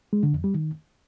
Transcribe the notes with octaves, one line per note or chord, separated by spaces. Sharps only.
G#3
D3
F2
G3
D#3